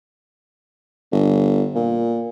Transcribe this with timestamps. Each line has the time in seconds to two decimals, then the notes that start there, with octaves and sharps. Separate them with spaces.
1.12 G1
1.75 A#2